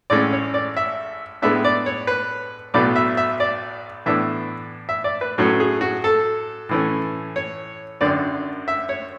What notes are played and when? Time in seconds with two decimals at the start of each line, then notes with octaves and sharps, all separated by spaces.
0.10 A1 A2 G#3 C#4 D5
0.33 C#5
0.54 D5
0.77 E5
1.42 A2 G#3 B3 D4 E5
1.64 D5
1.86 C#5
2.07 B4
2.74 B1 A2 F#3 B3 D5
2.96 E5
3.17 E5
3.40 D5
4.06 A2 E3 B3 D4 E5
4.89 E5
5.04 D5
5.21 B4
5.38 A2 F#3 A3 C#4
5.60 G#4
5.81 F#4
6.04 A4
6.69 A2 E3 A3 C#4
7.36 C#5
8.01 G#1 F#2 D3 D5
8.68 E5
8.89 C#5